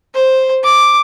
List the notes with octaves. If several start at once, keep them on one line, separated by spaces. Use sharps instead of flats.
C5
D6